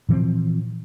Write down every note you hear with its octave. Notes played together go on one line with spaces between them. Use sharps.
A#2 E3 F3 C4